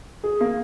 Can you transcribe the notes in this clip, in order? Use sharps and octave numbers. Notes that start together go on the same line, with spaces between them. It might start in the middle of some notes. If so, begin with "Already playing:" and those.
G#4
A#3